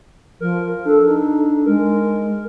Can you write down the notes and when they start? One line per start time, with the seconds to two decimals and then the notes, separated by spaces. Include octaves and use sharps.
0.40 F3 A#4
0.85 D4 A4
1.06 D#4
1.66 G#3 A#4